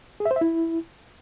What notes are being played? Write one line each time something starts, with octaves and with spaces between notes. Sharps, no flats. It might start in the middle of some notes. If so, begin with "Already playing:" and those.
G#4
E5
C5
E5
E4